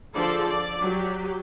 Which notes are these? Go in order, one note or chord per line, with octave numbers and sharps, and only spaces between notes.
D3 F3 G#4 A4 D5
D5
F#3 G4